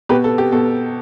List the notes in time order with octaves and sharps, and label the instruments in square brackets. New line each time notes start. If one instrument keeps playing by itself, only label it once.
[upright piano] B2 G4 B4
A4
G4
B2 A4